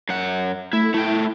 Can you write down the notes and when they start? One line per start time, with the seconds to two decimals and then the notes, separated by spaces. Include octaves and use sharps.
0.09 F#2 F#5
0.73 A3 E4
0.94 A3 E4 G5